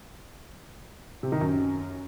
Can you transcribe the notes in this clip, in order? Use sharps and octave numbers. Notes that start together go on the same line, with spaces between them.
C3
D#3
F#2